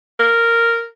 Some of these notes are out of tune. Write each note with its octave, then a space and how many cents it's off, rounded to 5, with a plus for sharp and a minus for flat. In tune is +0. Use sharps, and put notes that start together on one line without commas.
A#4 -10